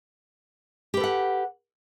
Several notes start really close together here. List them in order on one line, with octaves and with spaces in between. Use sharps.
G4 B4 A4 F#5